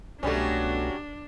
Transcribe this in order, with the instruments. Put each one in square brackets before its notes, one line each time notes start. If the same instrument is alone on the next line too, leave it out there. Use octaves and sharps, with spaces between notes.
[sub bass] C2 [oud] B2 A3 [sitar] F#3 G3 C#4 [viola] D4